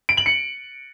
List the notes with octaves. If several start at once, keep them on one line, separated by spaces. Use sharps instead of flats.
D7
F#7
C#7